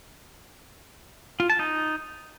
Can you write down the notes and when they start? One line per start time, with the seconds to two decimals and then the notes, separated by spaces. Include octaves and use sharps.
1.40 F4
1.50 A5
1.59 D#4